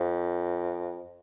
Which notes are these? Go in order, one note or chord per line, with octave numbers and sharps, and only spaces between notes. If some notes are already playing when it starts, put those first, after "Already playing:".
Already playing: F2